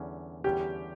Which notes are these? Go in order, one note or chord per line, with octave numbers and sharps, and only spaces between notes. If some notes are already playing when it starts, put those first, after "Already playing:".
Already playing: E2 D3 G3 C#4
E2 D3 G3 C#4 G4